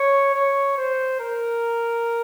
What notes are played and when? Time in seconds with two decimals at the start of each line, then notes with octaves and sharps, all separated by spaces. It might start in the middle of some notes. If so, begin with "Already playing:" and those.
Already playing: C#5
0.34 C#5
0.77 C5
1.20 A#4